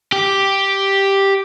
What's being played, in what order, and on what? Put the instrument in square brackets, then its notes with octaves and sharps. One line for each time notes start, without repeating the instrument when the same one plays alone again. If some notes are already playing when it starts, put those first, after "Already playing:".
[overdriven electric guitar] G4